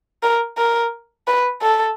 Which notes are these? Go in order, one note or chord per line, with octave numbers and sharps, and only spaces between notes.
A#4
A#4
B4
A4